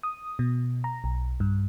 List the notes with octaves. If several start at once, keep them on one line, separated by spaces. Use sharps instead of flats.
D#6
B2
A#5
B1
G2